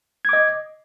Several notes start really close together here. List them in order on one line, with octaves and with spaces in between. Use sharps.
G#6 D6 D#5